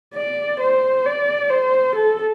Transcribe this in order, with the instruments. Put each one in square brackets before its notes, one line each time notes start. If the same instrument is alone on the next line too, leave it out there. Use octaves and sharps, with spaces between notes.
[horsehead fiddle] D5
C5
D5
C5
A4